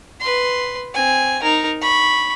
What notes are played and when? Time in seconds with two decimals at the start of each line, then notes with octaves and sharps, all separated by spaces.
0.21 B4 C6
0.94 C4 G#5
1.43 D#4 A#4
1.82 B5 C#6